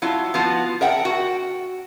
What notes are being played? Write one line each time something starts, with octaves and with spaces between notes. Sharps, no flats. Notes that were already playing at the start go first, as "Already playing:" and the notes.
F#3 E4 F4
F3 B3 F4 F#4
A#4 E5 F#5 G5
F#4